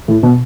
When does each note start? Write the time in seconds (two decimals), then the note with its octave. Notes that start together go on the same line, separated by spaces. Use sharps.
0.08 A2
0.23 B2